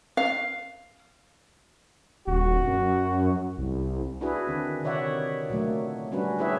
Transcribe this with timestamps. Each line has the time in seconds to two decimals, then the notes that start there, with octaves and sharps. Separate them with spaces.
0.17 F5
2.27 D#1 F#4
2.67 F#2
3.58 C2
4.21 D4 E4 F#4 G#4 B4
4.47 D3 D#3 C4
4.83 C3 D#3 C#5 D5 E5 F#5
5.50 A#2 F#3 A3 A#3
6.12 G3 C#4 D4 F#4 B4
6.39 E4 G4 G#4 B4 C#5 E5